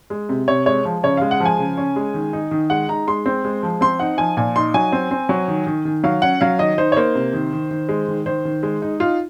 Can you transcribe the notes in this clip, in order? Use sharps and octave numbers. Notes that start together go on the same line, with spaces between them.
G#3
C3
C3 C#5
G#3 C#5
F3
C#3 C#5
G#3 F5
F#5
F3
G#5
C#3
C#4
G#3
D#3
D#4
D#3
G#3 F#5
D#4 A#5
G#3 C6
C4
G#3
F3
C4 C6
D#4 F#5
F3 G#5
A#2 G#5
D#4 C6
F#3 G#5
C4
C4
F#3
D#3
D#3
D#3
F#3 F5
C#4 F#5
F#3 F5
D#3 D#5
D#4 C5
C#5
A#3 C5
C3
D#3
D#3
D#3
G#3
D#3
D#3 C5
D#3
G#3
D#4
D#4 F4